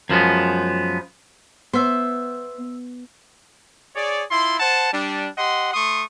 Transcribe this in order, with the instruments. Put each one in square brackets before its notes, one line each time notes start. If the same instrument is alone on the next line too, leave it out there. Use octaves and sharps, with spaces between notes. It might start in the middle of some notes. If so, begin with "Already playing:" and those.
[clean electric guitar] F#2 F3 G#3 B3
[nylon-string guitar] B3 [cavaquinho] C5 E5
[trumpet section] G#4 C#5 D5
E4 F4 C6
C5 F#5 A5
G3 D4
G4 D#5 F#5 C6
A3 C6 C#6 D#6